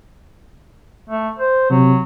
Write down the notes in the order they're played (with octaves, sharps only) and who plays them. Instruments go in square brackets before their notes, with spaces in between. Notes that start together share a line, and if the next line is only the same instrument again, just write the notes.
[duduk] A3
C5
[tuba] C3 [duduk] F#3